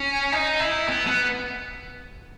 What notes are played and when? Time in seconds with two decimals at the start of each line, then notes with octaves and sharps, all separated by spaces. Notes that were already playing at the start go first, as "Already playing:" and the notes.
Already playing: C#4
0.32 D#4
0.60 E4
0.88 B3
1.07 B3